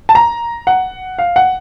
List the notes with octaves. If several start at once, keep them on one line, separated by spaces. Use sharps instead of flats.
A5
A#5
F#5
F5
F#5